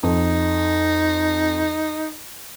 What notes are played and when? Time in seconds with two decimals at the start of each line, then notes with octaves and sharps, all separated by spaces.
0.03 F2 D#4